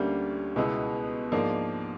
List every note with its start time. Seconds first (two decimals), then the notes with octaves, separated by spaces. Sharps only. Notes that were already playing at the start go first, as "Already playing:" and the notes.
Already playing: D2 D3 G3 A#3 C#4
0.56 C#2 B2 G#3 B3 E4
1.32 G#2 F3 A#3 D4